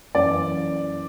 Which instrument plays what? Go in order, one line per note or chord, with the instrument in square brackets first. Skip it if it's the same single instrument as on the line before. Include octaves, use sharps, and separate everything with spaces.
[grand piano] F#2 E3 D5